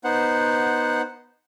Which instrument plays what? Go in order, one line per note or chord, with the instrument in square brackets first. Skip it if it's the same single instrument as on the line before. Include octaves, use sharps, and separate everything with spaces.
[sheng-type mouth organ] B3 D#4 C5 F#5